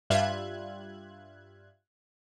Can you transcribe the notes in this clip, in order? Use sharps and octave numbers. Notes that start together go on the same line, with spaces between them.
G2 G3 F4 E5 F#6 G#6